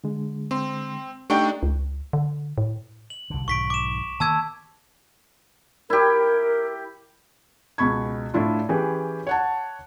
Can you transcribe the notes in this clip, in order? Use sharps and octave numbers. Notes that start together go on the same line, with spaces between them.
D3 G#3
C4 C6
A3 D4 D#4 G4 G5 C#6
C#2
D3
A2
F#7
C2 D3
B1 G#2 D#3 C#6 B6 D7
D6 E7
D#3 A#3 B3 A5 E6 G#6
E4 G4 A#4
C#2 B2 B5 C#6 G#6
A2 D4 E4 F4
E3 C#4 G4 G#4 B4
C#5 F#5 A5